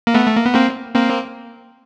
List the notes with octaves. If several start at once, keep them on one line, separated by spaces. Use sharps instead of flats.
A#3
A3 B3
A3
A#3
B3
A#3 C4
A#3 C4